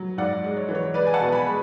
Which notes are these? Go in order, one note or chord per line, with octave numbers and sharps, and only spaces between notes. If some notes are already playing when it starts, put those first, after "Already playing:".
Already playing: F#3
G#2 D5 F#5
G#3
C#5
E3
C#5
G#3 B4 D5
G#5
F#5 A5
B2
G#5 B5
G#3